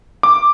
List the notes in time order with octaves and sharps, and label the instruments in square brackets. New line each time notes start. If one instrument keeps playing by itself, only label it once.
[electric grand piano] D6